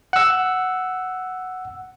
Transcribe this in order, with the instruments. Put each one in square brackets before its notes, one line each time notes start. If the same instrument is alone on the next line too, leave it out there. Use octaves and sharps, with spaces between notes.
[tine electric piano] F#5 E6